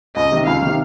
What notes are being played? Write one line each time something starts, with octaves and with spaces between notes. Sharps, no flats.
C#2 D#5
C3 D#3
C#2 F5
C3 D#3